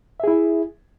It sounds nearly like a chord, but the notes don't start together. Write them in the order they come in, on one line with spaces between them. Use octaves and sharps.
E5 G#4 E4